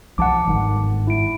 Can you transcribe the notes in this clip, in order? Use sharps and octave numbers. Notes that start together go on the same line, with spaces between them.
B1 F3 F#5 A5 D6
G1 G#2 D#3
E4 D7